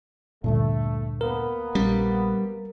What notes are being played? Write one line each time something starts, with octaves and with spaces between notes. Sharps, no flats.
D2 G2 A#2 A3
A#3 B3 A#4
A#1 G3 C#4